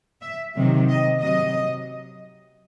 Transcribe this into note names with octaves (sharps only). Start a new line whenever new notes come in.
E5
C3 D#3 F#3
D#5
C3 F#3 D#5